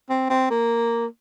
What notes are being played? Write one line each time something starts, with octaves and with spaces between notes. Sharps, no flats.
C4
C4
A#3